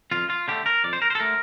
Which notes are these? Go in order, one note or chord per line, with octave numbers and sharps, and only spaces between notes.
F2 F4
F4
D3 A3 G4
A#4
F2 D5
C5
A#4
C5
A4
D3 A3 A#4